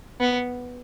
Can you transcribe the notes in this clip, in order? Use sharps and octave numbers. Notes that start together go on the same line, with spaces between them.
B3